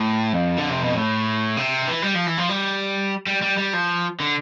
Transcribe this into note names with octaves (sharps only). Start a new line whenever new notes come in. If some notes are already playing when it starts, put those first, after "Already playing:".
Already playing: A2
F2
D3
C3
B2
A2
C3
E3
G3
F3
E3
F3
G3
G3
G3
G3
F3
D3